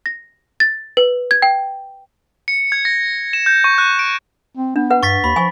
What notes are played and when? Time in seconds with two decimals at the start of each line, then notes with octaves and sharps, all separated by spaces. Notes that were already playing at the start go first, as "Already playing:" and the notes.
0.06 A#6
0.60 A6
0.97 B4
1.31 G#6
1.42 G5
2.48 C#7
2.72 G#6
2.85 A#6
3.33 E7
3.46 G6
3.64 C#6
3.78 F#6
3.99 D7
4.55 C4
4.76 B3 D4
4.90 B4 F#5
5.03 G2 C#6 A6 B6
5.24 D#2 B5
5.36 F3 G#5 C#6